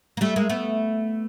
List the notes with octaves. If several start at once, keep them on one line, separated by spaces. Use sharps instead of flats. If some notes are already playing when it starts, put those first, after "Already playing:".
A#3
G3 A3
G#3 A#3
A3 B3